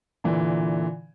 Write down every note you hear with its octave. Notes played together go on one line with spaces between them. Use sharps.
A#2 D3 E3